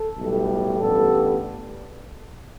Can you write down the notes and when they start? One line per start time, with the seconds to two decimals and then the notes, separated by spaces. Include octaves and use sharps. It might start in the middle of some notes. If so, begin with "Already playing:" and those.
Already playing: A4
0.18 B1 A2 G3
0.80 A1 G2 G3 B3 A4